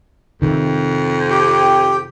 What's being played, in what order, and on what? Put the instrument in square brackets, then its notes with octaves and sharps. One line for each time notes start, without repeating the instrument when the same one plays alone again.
[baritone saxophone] F2 [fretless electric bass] C3 D#3
[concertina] G4 G5